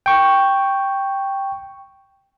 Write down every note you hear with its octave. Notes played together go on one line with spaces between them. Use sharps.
G5 C#6